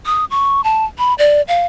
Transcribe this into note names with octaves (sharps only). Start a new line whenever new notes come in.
D#6
C#6
A5
B5
D5
F5